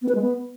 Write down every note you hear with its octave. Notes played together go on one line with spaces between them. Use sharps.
B3
B4
G#3
B3